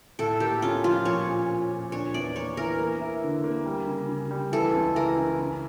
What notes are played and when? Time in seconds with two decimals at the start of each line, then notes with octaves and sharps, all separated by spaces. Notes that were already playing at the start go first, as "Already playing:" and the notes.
0.19 A2 A4
0.40 A#3 G4
0.62 C#4 F4
0.84 F3 F4
1.05 A#2 C#5
1.27 C#4
1.49 C#4
1.70 A#2
1.92 D4 C#5
2.14 E2 D5
2.36 A#3 C#5
2.57 E3 A#4
2.79 A#3
3.01 E4
3.23 D3
3.44 A#3
3.66 G3
3.87 C#3
4.09 C#3
4.31 G3
4.52 E3 A4
4.74 C#2
4.95 E3 A#4
5.17 C#3
5.39 C#3